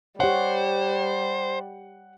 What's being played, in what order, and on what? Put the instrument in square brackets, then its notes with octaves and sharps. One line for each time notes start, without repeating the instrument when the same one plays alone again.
[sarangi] G3 [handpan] G4 C#5 [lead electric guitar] C5 [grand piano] F#5